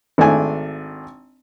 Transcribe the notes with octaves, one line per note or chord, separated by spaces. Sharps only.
G#1 A3 D4 G#5